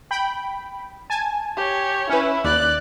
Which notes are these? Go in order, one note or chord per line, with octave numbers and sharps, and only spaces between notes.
G5 B5
G#5 A5
G4 C#5
C#4 E4 B4
D#2 D5 F#6